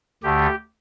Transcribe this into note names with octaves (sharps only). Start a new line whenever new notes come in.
D2 D3 A3 G4